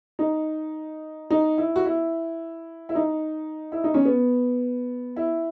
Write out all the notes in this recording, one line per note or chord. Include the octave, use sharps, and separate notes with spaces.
D#4
D#4
E4
F#4
E4
E4
D#4
E4
D#4
C#4
B3
E4